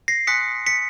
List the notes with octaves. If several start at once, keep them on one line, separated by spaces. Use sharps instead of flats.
A#6 C7
G#5 C6 D#6 F#6 B6 C#7
B6 C#7